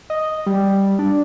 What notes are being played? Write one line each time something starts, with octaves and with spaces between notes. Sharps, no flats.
D#5
G3
D4